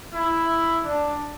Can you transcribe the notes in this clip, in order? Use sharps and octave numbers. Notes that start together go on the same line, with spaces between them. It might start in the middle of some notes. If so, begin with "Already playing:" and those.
E4
D4